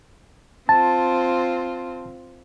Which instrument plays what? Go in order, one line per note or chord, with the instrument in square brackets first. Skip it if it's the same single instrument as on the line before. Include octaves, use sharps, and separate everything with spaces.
[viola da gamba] C4 F4 [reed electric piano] A5